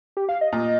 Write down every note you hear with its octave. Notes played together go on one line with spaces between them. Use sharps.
G4
F5
D#5
A#2 D#5